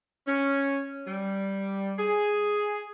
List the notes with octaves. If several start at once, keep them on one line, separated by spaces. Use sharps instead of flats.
C#4
G3
G#4